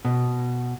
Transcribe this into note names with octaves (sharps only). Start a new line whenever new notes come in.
B2